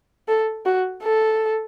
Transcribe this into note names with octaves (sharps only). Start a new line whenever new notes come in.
A4
F#4
A4